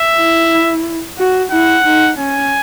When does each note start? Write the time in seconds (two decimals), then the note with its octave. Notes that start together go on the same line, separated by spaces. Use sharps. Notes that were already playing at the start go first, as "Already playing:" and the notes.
Already playing: E5
0.18 E4
1.18 F#4
1.52 E4 F#5
1.85 D#4
2.19 C#4 G#5